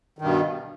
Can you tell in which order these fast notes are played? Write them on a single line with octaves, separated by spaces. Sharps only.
D#3 G2 B2